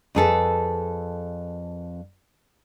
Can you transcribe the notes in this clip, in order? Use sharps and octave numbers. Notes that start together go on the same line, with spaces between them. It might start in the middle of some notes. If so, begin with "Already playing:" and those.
F2 G#4 A4 B4